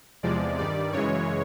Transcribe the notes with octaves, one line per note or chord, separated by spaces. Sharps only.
E2 C3 F3 G#3 D5
G2 D#3 G3 D5
F#2 C#3 E3 G#3 C#5